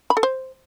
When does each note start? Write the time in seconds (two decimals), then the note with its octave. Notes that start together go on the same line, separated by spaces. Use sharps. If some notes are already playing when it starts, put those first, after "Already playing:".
0.10 B5
0.17 A4
0.23 C5